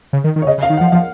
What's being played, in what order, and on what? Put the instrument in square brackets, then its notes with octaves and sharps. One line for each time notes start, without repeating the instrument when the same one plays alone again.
[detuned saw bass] C#3
D#3
D#3
[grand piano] C#5
[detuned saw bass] C#3 [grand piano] D#5
[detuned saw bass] C#3
[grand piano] F5
[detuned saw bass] D#3
[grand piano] F#5
[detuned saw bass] F3
[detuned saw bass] F3 [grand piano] F5